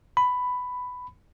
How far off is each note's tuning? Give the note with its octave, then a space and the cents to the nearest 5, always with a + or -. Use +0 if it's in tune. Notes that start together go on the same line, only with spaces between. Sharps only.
B5 +10